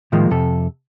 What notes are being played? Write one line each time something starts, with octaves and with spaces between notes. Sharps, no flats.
A2 D#3 F3 G#3 A#3
F2 C3 A4